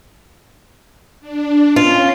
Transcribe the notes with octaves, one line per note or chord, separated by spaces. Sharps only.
D4
C#4 F4